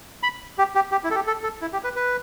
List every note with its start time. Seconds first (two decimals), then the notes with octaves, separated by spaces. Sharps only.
0.23 B5
0.58 G4
0.75 G4
0.92 G4
1.04 E4
1.11 A4
1.15 G4
1.27 A4
1.43 A4
1.61 E4
1.73 G4
1.84 B4
1.96 B4